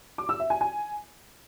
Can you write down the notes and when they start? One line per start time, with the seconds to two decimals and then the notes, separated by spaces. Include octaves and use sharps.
0.18 D6
0.29 E6
0.40 E5
0.50 G#5
0.61 G#5